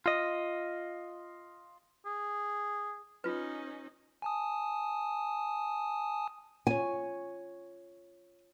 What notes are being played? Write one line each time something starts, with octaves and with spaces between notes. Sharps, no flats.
F4 D#5
G#4
C#4 D#4 F4 B4
G#5 A5 D#6
F4 C#5 G#5